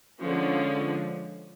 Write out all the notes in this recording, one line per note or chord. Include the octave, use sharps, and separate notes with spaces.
D3 F3 G#3 C#4